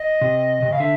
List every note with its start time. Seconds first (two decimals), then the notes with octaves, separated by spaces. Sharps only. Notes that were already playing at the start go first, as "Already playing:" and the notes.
Already playing: D#5
0.21 C3
0.62 C3
0.71 C#3 F5
0.80 D3 E5